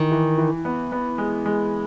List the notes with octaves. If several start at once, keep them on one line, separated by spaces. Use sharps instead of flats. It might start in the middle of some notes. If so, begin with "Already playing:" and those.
Already playing: D#3 E3
E3
E3
B3
B3
G#3
G#3